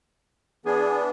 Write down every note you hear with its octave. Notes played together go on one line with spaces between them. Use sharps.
E3 B3 D4 G#4